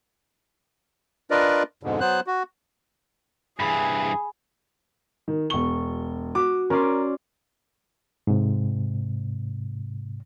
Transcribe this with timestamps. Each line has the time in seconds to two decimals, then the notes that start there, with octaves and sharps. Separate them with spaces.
1.31 D4 F4 A#4 B4 D5 D#5
1.83 F2 G#2 B2 D3
2.00 F#3 B3 C5 F#6
2.27 F#4
3.60 G2 E3 G#4 B5
5.28 D#3
5.50 E1 C#6 G7
6.35 F#4 D6
6.70 C#4 A#4 D5 C6
8.27 G#2 C3